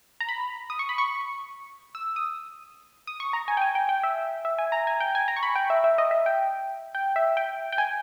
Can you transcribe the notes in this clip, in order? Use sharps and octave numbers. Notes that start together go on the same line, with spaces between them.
A#5
B5
D#6
C#6
B5
C#6
E6
D#6
D#6
C#6
A#5
G#5
G5
G#5
G5
G5
E5
E5
G#5
A#5
G#5
G5
G#5
A#5
C#6
B5
G5
E5
E5
D#5
E5
G5
G5
E5
G5
G5
G#5